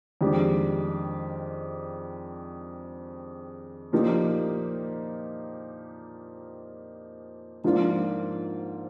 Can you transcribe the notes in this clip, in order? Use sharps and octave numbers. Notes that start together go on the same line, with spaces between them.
F2 D#3 G#3 D4 G4
A#2 F3 A#3 D#4 G4
G#2 F3 A#3 D4 F4